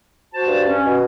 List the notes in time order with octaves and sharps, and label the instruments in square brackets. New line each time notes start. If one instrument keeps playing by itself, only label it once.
[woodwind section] F#4 C5 A5
[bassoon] G2
[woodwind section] C#4
[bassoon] B2